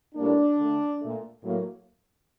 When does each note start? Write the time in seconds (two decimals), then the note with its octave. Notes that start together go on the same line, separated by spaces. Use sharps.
0.15 A2 G3 A#3 D4
0.57 D3 A3
1.00 A#2 A3
1.42 A2 F#3 A#3